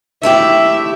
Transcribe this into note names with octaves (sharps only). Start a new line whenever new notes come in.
A3 E4 G4 E5